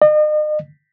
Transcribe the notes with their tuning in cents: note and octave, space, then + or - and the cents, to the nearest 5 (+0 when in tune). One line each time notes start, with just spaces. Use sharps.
D#5 -40